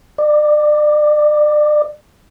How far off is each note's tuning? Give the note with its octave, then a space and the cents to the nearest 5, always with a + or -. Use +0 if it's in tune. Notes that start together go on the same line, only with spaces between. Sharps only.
D5 +35